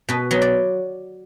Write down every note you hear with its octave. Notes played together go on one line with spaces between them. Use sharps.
B2 B4
F#3 B3
D5